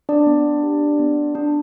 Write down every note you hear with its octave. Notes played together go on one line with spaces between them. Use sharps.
D4 D5
B3
G4
B3
D4